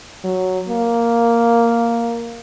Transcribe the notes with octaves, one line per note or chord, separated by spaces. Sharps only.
F#3
A#3